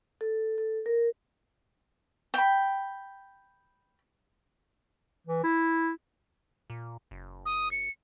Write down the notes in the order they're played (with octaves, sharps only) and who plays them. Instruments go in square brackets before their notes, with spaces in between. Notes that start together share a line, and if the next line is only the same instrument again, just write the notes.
[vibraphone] A4
A4
A#4
[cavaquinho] G5 B5
[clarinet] E3
E4
[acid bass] A#2
F#1
[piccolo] D#6
C#7